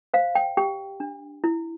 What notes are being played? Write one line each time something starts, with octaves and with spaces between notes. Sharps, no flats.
C5 F5
G5
G4 G5
D4
E4